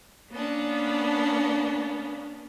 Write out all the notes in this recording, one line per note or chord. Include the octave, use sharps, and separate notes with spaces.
A#3 B3 C#4 D4